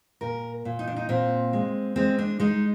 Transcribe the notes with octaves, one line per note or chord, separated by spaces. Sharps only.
A#2 A#4
A#2
D#4
D4
D#4
A#2 C4
G#3
G#3 C4
D4
G#3 D#4